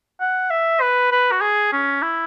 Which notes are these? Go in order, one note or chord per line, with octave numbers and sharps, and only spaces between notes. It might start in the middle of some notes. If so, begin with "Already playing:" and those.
F#5
E5
B4
B4
F#4
G#4
C#4
E4